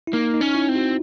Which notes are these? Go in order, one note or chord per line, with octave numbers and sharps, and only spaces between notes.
E4
A#3 D#4
D#4
C#4
E4
C4
F#4